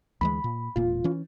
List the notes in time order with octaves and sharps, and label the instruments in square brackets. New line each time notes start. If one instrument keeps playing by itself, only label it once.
[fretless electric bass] D2 E3 G#3 [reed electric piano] B5
[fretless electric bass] A#2
[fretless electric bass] E1 A#2 A#3 [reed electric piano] F4
[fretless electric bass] E3 C#4